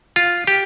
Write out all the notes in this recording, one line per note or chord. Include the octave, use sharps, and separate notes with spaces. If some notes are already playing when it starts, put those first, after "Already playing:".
F4
G4